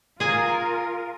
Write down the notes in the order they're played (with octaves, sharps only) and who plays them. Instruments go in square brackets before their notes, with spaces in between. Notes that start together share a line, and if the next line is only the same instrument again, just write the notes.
[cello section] F4 A#4 [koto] G#4 G#5